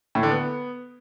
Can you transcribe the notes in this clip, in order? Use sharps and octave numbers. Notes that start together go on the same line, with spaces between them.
A2
D3
B3